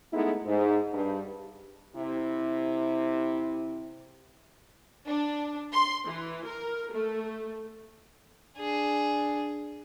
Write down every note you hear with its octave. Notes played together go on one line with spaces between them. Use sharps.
G#3 A3 B3 D#4 E4
G#2
G2
C3 E4
D4
C6
E3
A#4
A3
D4 G#4